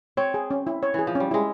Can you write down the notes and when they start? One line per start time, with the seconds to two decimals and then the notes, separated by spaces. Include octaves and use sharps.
0.17 C4 C#5
0.34 G#4
0.51 C#4
0.67 E4
0.83 C#5
0.94 E3 G#4
1.07 F3
1.15 G3 C#4
1.31 G#3 E4